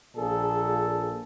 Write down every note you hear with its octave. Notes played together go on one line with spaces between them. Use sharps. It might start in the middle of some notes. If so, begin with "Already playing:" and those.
A#1 A#2 G#4 A4